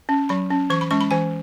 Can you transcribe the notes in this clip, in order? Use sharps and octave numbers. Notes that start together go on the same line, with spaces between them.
C#4
F#3 B5
C#4
E3 C#6
B5
G#3 C#4 C#6
B5
E3 G#5